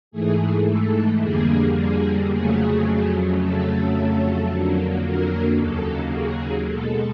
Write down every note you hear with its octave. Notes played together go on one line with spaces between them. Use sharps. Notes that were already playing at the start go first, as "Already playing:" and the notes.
G#2 E3 A3 G#4
A4
F2 D3 G3 A#3 G#4
G#4
F2 C#3 F#3 A3 G#4
F2 C#3 F#3 A3 A4
F2 D3 F#3 A#3
A#4
D#2 C#3 F#3 A#3 A4
G#4
B2 G#3 A4